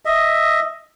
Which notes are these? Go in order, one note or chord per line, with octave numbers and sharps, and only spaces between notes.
D#5 E5